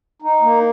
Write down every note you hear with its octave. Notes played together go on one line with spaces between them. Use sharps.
D#4
A#3